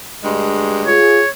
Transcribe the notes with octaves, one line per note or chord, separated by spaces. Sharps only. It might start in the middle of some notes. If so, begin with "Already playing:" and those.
D2 G2 G#3
F4 G#4 C#5